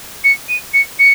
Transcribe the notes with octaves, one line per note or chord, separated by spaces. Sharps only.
C#7
D#7
C#7
C#7